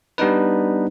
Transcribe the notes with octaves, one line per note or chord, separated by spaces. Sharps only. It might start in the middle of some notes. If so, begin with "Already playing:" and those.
G3 B3 D4 D#4 B4